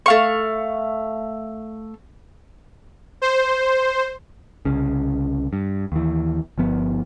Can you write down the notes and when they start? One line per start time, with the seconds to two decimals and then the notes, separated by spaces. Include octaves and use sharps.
0.06 A3 F5 C#6
3.22 C5
4.65 C2 C#3
5.53 G2
5.92 D#2 E3
6.58 G1 F3 B3